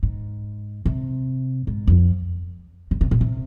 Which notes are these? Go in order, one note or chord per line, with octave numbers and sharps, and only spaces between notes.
G#2
C3
G#2
F2
C#3
C3
A#2
C3